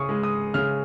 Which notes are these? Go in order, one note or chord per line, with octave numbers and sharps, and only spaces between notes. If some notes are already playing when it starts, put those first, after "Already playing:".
Already playing: C#3 C#6 D#6
G#3
D#6
C#3 F6